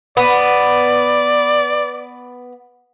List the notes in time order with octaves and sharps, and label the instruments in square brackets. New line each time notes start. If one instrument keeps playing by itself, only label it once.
[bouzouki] B3 [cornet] D5